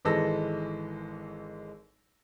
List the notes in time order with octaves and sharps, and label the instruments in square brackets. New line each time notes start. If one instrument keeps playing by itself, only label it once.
[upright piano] G#1 E3 G#3 A4 E6 A#6